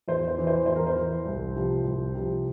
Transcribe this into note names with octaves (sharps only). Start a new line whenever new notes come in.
E2 C5
C5
E3
C5
E2 C5
A#4
C5
E3
C2
C3 F3
C2
C3 F3